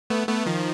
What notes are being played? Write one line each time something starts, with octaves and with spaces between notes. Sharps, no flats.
A3 B3
A3 B3
D#3 F3